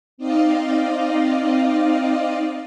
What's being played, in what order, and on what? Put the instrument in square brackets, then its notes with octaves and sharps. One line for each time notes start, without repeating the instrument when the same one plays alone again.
[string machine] C4 D#4 D5 D#5 F5